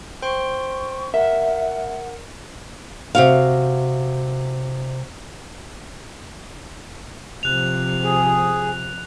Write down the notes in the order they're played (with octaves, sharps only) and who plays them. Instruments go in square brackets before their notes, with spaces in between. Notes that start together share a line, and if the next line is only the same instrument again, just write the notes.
[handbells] C5 G5 C6 [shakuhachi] C#6
[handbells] A#4 [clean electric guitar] E5 [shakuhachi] F#5
[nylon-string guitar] C3 F#4 F5
[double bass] C3 F3 [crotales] F#6 F7
[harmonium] G#4